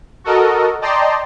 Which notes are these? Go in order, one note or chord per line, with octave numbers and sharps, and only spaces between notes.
F#4 A4 A#4 D#5
D5 D#5 G5 A5 A#5 C6